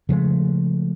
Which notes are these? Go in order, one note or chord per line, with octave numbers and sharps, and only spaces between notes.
C#3 F3 G#3 A3